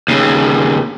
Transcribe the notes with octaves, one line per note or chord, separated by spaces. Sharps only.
D#2 C#3